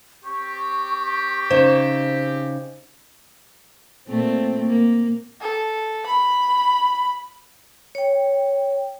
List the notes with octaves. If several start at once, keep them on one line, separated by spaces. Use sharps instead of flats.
C4 G4 C#6
C#3 D#4 C5
A#2 A3 C4
A#3
A4
B5
C#5 G5